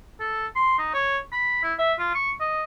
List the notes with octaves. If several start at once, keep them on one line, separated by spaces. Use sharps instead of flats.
A4
C6
D#4
C#5
B5
E4
E5
F4
C#6
D#5